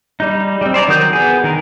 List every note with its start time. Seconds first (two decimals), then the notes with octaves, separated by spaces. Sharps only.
0.20 G3 D#4
0.61 G3 C4
0.74 C5 D5 G#5 A#5
0.88 D#3 F#3 A#4 D#6 G6
1.13 B3 G#4
1.44 D#3 A#4